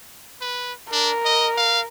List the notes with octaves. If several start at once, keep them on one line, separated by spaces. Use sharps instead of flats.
B4
D4 A#4
D#5
F5